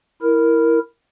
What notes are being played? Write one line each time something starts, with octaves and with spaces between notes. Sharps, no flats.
E4 A#4